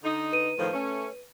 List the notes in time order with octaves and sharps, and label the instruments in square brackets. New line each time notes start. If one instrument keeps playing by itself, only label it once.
[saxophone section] D3 D#4
[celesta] B4 D#7
[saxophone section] A2 D#3 F3
A3 C#4